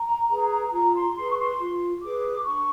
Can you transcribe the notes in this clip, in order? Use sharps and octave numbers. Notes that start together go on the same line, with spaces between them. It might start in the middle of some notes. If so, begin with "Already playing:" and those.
Already playing: A#5
G#4 B4
F4 A#5
C6
G#4 B4 C6
C#6
C6
F4
G#4 B4 D6
D4 C#6